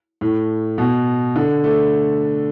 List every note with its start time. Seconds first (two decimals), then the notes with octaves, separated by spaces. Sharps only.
0.21 A2
0.78 B2
1.36 D3
1.64 A3